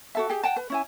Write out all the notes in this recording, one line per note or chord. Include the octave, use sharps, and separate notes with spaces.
F#4 A4 E5
G4 G#4
F#5 G5 A5
B4
C#4 E4 G#5